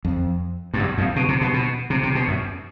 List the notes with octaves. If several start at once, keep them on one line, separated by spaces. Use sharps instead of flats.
F2
G2
F#2
F2
B2
C3
B2
B2
C3
C3
B2
F#2